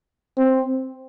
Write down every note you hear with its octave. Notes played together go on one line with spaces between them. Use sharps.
C4